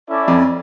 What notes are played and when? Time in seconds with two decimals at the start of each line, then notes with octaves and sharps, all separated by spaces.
0.09 C#4 E4 A4 D5
0.28 F2